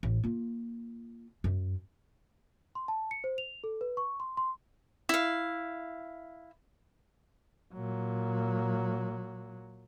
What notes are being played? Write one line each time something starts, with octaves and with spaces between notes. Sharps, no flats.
A1
A#3 F4
F#2
C6
A5
C#7
C5
F7
A4
B4
C#6
C6
C6
E4 F5
A#2 F#3